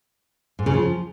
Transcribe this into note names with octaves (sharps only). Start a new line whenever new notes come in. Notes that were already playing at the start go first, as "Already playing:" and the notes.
G#2
C#3
F3